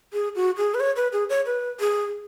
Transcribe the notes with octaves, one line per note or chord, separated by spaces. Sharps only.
G#4
F#4
G#4
B4
C#5
B4
G#4
C#5
B4
G#4